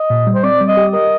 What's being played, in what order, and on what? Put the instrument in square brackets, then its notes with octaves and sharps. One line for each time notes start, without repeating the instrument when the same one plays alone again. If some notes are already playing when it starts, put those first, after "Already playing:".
Already playing: [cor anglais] D#5
[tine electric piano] A#2
G3
[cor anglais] C5
[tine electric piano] C4 [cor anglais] D5
[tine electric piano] G3
[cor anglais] D#5
[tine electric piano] G4
[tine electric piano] A#4 [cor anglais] D#5